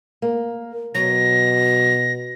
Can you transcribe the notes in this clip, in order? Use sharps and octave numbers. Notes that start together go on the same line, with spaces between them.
A#3
B2 F#3 A#6